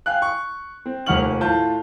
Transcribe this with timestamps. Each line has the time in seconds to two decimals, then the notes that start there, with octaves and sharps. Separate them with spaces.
0.06 F5 G5 G#5 F#6
0.22 C#6
0.86 C4
1.06 F1 D#2 F#5 C#6 F6 F#7
1.41 A2 F4 A5 G6